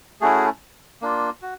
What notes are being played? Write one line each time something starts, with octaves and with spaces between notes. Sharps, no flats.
A3 C#4 E4 F#4 G#4
A#3 D4 F4
F#4